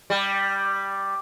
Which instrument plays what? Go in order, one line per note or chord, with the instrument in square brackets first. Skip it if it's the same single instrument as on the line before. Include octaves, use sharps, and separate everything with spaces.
[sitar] G3